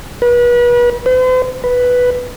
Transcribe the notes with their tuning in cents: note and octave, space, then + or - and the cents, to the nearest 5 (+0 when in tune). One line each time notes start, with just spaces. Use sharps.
B4 -35
C5 -45
B4 +0